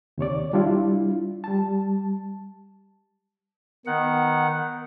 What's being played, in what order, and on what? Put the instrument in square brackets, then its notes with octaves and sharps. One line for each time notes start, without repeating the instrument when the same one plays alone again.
[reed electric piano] D#2 C3 C#5 D5
G3 D4 E4 F4
G3 A5
[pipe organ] D#3 F#5 [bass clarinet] B3